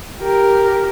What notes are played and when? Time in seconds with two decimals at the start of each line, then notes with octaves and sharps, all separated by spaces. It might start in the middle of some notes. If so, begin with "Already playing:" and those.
0.21 G4 A#4